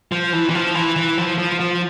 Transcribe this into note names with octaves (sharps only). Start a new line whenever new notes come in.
F3
E3
E3
F3
E3
E3
F3
F3
F3